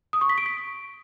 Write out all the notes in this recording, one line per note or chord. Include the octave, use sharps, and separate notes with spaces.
D#6
C#6
B6
D7
B6